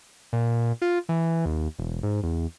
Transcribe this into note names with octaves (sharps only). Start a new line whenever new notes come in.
A#2
F4
E3
D#2
E1
G#2
E2